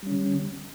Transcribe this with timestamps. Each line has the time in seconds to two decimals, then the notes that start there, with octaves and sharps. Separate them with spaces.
0.03 G3
0.07 C#4
0.11 D3